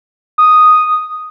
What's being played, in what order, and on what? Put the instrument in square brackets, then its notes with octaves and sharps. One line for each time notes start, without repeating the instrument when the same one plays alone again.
[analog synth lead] D#6